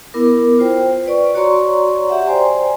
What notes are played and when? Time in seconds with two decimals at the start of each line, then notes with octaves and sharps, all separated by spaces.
0.14 B3 E4 A#4 D6
0.59 F4 C5 G5
1.06 B4 D5 C#6
1.34 F#4 C#5 D5 A#5 C6 C#6
2.09 G4 E5 F#5
2.26 C5 D5 G5 G#5 A#5 C6